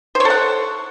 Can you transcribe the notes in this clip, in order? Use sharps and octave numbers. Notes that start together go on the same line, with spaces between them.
A4 C5 C#5 F#5